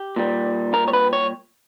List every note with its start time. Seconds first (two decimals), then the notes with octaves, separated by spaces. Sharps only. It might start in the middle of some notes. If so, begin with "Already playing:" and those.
Already playing: G4
0.16 A#2 G3
0.74 A#4
0.88 C#5
0.93 B4
1.13 C#5